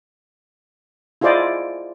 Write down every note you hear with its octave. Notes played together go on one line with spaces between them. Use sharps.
E4 F4 G#4 C5 D5 D#5